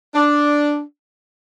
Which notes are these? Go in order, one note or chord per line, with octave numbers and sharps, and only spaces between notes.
D4